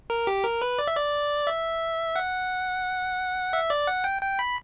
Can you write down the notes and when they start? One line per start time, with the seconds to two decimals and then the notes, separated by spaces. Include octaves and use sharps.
0.10 A#4
0.27 G4
0.44 A#4
0.62 B4
0.79 D5
0.87 E5
0.96 D5
1.47 E5
2.16 F#5
3.53 E5
3.70 D5
3.87 F#5
4.04 G5
4.22 G5
4.39 B5